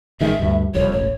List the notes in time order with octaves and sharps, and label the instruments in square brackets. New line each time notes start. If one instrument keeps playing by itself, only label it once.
[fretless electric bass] A1 D#3 G#3 [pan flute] E5
[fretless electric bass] D2 G2
[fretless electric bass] E1 C2 F2 [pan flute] C#5
[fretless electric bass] E1 A1 [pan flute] C#5